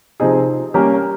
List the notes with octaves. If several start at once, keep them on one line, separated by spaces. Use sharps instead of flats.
C3 F3 C4 D#4 G#4
G3 A#3 C#4 G4 A#4